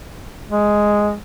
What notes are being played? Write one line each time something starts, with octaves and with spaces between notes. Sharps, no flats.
G#3